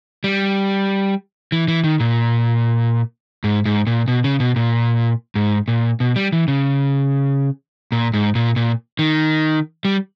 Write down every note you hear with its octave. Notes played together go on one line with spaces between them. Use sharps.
G3
E3
E3
D#3
A#2
G#2
G#2
A#2
B2
C#3
B2
A#2
G#2
A#2
B2
G3
E3
C#3
A#2
G#2
A#2
A#2
D#3
G3